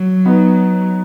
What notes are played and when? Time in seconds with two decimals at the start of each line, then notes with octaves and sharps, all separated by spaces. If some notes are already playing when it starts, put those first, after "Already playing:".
Already playing: F#3
0.25 B3 D#4